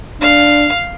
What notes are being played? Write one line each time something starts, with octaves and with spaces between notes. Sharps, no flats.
D4 F5